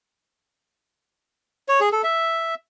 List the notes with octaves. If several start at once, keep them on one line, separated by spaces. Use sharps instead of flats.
C#5
G#4
A4
E5